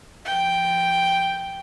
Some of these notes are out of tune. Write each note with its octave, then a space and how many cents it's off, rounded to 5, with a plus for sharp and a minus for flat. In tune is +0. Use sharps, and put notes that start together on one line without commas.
F3 -25 G5 +0